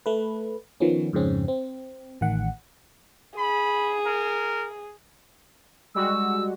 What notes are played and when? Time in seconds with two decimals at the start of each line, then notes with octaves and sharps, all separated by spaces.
0.06 A3 B4
0.80 D#3 F3 B3 C#4
1.13 F2 G#2 C#3 C4 C#4
1.48 C4
2.21 A1 D#3 F#5
3.38 G#4 B5
4.06 A#4
5.95 G3 G#3 F#4 E6